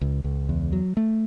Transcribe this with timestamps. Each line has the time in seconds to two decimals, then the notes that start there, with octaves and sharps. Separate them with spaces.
0.01 C#2
0.24 C#2
0.49 E2
0.73 F#3
0.97 A3